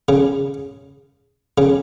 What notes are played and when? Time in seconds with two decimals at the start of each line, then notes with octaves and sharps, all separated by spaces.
0.09 C#3
1.58 C#3